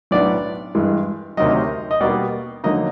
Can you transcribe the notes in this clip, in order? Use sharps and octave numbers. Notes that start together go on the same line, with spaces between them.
B1 A2 F#3 B3 D4 D5
G2 E3 G#3
D2 C3 D#3 F#3 D#5
D#5
B2 G3 A#3 D5
F2 D3 F#3 A#3 D#4 D#5